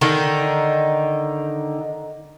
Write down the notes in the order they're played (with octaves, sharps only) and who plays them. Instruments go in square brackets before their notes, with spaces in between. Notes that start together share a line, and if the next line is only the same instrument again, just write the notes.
[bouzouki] D3 D#3 D#4